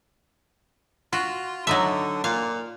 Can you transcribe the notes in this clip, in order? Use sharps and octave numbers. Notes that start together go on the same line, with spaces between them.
F4 F#4
D3 F#3 D#4 E5
A#2 F5